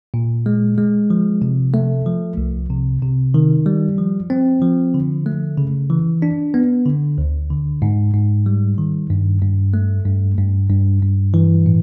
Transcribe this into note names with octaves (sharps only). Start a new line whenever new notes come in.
A#2
G#3
G#3
F3
C3
A3
F3
C2
C3
C3
D#3
G3
F3
C4
F3
D3
A3
C#3
E3
D4
B3
D3
D2
D3
G#2
G#2
G3
D#3
G2
G2
A3
G2
G2
G2
G2
E3
A2